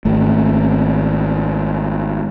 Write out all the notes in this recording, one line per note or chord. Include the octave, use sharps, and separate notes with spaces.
G#1 A3